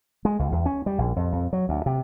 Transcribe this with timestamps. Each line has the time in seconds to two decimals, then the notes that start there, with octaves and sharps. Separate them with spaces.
0.25 G#3
0.39 C#2
0.52 E2
0.66 C#4
0.86 G3
0.98 A#1
1.16 F2
1.33 F2
1.53 F#3
1.69 D2
1.86 C3